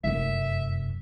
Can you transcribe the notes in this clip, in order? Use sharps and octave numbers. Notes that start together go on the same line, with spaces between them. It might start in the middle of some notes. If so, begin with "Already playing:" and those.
F1 F#2 E5